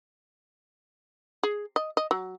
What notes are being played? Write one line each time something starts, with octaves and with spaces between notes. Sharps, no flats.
G#4
D#5
D#5
F#3